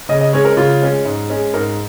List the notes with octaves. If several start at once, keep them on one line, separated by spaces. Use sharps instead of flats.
C#3 D#5
D#5
G#3 C#4 C#5
A#4
C#3 F4
G#3 C#4
G#2
G#3 C#4
G#2 A#4